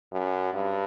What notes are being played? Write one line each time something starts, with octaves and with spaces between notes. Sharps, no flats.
F#2
G2